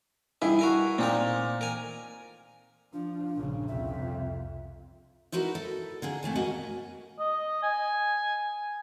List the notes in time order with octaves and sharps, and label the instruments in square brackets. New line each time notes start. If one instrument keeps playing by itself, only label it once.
[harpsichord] G2 G#4 [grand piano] E4
[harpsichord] F#4 A#4 G#5
[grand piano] A#2 [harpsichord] C4 D#4 A#4
[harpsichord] A#4 G#5
[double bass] F3 [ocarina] D4
[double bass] A#1 C#3 [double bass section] G2 F3
[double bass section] C2 [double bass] F2 [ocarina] E5
[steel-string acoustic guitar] D#4 E4 F#4 A#4 B4
A4
D3 A#3 G#4
F2 A3 G#5 A5
B2 A#3 F#4 A#4 D#5 G#5
[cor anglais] D#5
G#5